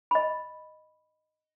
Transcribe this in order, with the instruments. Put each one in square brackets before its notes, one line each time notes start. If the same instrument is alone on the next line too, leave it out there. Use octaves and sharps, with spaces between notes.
[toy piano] D#5 B5